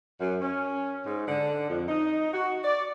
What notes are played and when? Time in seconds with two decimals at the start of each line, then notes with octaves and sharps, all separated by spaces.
0.20 F#2
0.41 C#4
1.06 G#2
1.28 D3
1.69 F2
1.88 D#4
2.33 F#4
2.64 D5